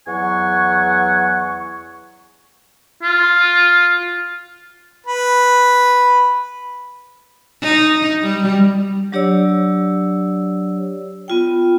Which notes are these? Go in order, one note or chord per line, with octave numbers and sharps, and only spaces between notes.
E2 F#3 F#5 G#5 C#6
F4
B4
D#4
G3
F#3 D4 G4 C#5 D5 E6
B3 F4 G5